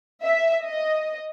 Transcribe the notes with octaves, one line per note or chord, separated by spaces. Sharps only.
E5
D#5